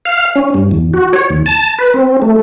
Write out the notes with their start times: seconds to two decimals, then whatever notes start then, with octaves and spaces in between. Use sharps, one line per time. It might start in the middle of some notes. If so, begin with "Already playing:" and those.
0.05 F5
0.36 C#4
0.54 G2
0.71 E2
0.93 F#4
1.13 C#5
1.30 D#2
1.46 A5
1.78 B4
1.94 C4
2.22 A3